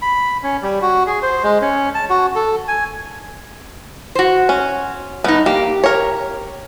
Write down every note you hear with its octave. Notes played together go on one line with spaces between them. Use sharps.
B5
C#4
G3
F#4
G#4
C5
G#3
C#4
A5
F#4
A4
G#5
F#4 C5
C#4
G2 B3 D#4
A#3 G4
A#4 C#5